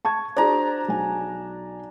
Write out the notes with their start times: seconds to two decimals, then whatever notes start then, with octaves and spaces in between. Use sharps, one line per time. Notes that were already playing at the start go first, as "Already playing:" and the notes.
0.05 A5 C#6 G#6
0.37 D4 F#4 G#4 C5 A#5
0.88 B1 G#5